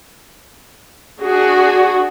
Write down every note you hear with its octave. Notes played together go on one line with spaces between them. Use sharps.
D4 F#4 G#4